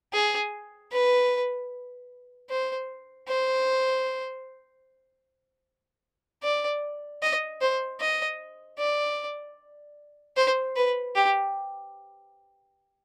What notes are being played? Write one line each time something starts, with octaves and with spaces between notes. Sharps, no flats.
G#4
B4
C5
C5
D5
D#5
C5
D#5
D5
C5
B4
G4